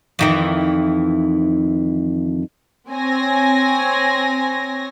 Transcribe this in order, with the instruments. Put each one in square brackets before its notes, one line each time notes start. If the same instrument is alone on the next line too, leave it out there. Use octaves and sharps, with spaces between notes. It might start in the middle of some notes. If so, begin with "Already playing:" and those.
[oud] F2 D#3 E3
[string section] C4 C#5 G#5 A#6